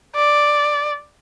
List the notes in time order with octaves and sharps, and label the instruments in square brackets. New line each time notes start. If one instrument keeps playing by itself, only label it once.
[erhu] D5